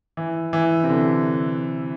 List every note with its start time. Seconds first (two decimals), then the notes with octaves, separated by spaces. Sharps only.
0.17 E3
0.53 E3
0.84 C3
0.89 D3